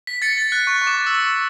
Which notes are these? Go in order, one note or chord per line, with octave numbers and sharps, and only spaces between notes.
B6
A6 C#7
A6
F#6
C#6
C#6
D6
E6